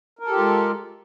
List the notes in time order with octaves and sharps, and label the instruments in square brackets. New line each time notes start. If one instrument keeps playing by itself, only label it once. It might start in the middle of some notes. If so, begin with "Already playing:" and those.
[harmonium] A#4
A4
G4
F4
G#3